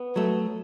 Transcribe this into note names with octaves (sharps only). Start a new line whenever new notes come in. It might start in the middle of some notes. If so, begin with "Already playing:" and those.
Already playing: B3
F#3 A3